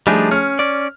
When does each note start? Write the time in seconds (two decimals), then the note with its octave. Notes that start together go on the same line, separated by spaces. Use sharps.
0.07 F3 G3 A3 D4 D#4 G#4
0.31 C#4 F6
0.59 C#4 D5